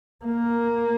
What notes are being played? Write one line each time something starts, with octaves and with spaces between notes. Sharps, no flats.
A#3